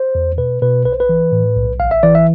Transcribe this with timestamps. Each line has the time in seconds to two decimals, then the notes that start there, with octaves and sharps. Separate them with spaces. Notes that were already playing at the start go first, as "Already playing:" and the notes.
Already playing: C5
0.15 E2
0.38 B2 B4
0.62 B2 B4
0.85 B1 B4
0.92 C5
1.00 B4
1.09 E3
1.32 A2
1.56 B1
1.80 A1 F5
1.91 E5
2.03 E3 D5
2.15 E5